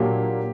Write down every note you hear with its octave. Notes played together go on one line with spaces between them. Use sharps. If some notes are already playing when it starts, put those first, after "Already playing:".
Already playing: A#2 F#3 A#3 D4 G4